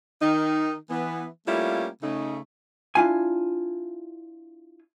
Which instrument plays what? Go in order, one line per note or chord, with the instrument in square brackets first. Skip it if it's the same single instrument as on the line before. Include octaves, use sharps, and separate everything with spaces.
[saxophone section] D#3 D#4
E3 B3
G3 A3 A#3 C#4 E4 F4
C#3 A3 D#4
[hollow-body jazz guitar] D4 E4 F4 G#5